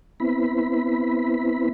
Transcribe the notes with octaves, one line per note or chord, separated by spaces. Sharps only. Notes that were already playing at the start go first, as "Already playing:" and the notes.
B3 C4 E4 B5